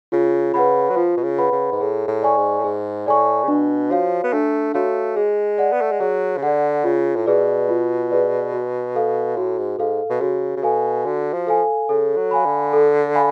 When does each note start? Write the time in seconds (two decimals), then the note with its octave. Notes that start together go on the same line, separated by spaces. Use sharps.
0.12 C#3 F4
0.54 C#3 B4 F#5 B5
0.90 F#3
0.97 F3 F4
1.17 B2
1.24 C#3
1.38 B4 F#5 B5
1.52 C#3
1.72 G#2
1.80 A2 G#4
2.08 A2
2.22 D5 G#5 C#6
2.37 G#2
2.59 A2
2.64 G#2 G#4
3.06 A2 D5 G#5 C#6
3.44 C#3
3.48 B2 D4
3.90 F3 F#4 C#5 F5
4.24 B3
4.33 A3 D4
4.74 A3 F#4 C#5 F5
5.16 G#3 G#4
5.58 D5 F#5
5.72 B3
5.82 A3
5.92 G#3
6.00 F#3 G#4
6.37 C#3
6.43 D3 D5 F#5
6.84 C#3 F4
7.16 A2
7.26 B2 G#4 B4 D5
7.69 F4
8.10 G#4 B4 D5
8.52 F#4
8.95 A4 F5
9.37 A2 F#4
9.58 G#2
9.79 G#2 A4 F5
10.10 B2
10.21 C#3 F#4
10.56 C#3
10.63 B2 A4 F5 G#5
11.05 D3 F#4
11.33 F3
11.47 A4 F5 G#5
11.89 C#3 A4
12.16 F#3
12.31 F5 G#5 B5
12.46 D3
12.73 A4
13.15 F5 G#5 B5